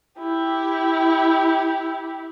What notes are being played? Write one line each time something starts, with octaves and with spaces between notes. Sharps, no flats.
E4 G4